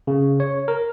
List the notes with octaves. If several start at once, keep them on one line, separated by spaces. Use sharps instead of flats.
C#3
C#5
A#4